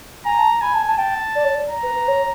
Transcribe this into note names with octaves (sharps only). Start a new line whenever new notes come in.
G#5 A#5
A5
G#5 B5
A5
A5
G5 A5
D5
C#5
D5
A#5
B4
B4
C#5